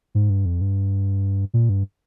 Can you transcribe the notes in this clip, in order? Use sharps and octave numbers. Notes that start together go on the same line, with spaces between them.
G#2
G2
F2
G2
A#2
G2